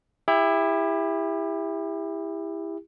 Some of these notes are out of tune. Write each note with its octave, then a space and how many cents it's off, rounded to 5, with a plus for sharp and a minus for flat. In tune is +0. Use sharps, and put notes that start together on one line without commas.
E4 +0 G4 +35